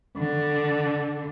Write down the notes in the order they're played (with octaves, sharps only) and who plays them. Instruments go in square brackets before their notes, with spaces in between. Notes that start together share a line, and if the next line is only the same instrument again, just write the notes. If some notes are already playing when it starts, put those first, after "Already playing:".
[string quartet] D3